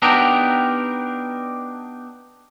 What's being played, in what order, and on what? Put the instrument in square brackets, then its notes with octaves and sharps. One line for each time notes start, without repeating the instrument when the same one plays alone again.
[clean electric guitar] B3 D4 D#4 G4 A#4